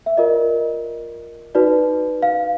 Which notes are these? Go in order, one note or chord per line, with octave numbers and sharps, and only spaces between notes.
E5
F4 A#4 D5 D#5
D#4 F#4 B4 D5
F5